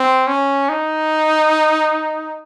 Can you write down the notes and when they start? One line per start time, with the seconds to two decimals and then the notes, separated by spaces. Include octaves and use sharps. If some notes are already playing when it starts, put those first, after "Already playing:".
Already playing: C4
0.27 C#4
0.69 D#4